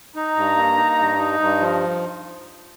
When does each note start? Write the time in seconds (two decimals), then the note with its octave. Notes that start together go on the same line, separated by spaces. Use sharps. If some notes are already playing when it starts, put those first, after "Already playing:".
0.16 D#4 A#5
0.36 G2
0.57 A#3
0.77 D#4
0.98 G2
1.19 D#4
1.40 G2
1.60 F3